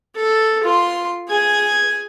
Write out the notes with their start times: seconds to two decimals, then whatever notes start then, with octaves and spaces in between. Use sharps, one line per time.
0.16 A4
0.64 F4 C6
1.29 G#4 G#5